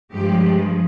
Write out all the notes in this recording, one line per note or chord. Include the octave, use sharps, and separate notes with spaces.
G2 F3 G#3 G4